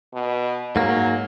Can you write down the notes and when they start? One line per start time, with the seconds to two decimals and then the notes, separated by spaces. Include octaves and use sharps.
0.14 B2
0.76 G#2 F#3 A#3